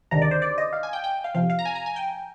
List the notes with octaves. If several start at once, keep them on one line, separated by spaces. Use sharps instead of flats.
D2 C3 D#3 G#3 D4 A#5
D5
C5
D5
D#5
F5
G#5
G5
G5
F5
F2 C3 F3 F5
F5
A#5
G#5
A#5
G#5
G5